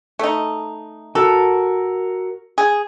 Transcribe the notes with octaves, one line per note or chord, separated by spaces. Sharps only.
A3 D#4
F#4 A4 A#4
G#4